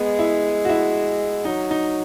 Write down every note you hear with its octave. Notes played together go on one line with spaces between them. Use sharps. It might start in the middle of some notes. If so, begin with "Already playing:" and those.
Already playing: G#3 B3
E4
F#4
E4
F#3 D#4
D#4